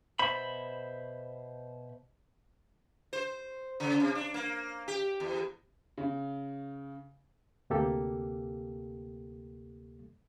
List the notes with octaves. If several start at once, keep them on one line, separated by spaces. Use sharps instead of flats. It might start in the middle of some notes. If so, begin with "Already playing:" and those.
B2 C5 E5 B5
C5
C#3
C3
D4
A#3
G4
E2
C#3
D2 C3 A#3 G4 A4